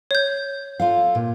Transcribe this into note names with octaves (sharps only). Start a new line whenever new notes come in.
C#5 G6
F4 A4 F5
A#2